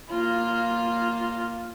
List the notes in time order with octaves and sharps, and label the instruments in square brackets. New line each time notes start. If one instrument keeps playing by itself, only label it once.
[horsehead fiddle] A#3 F4